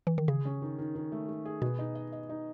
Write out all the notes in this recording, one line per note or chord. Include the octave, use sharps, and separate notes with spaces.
E3
D#3
C#3 G#4
C#4
D#3
D#3
D#3
A3
A3
G#4
B2 B3
D#4
D#5
D#5
D#4